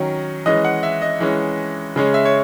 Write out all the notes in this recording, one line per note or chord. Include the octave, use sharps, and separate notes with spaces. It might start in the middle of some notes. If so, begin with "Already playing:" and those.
Already playing: D#3 F#3 C#4
E3 G#3 C#4 D#5
F#5
E5
D#5
E3 G#3 C#4
C#3 G#3 C#4
E5
C#5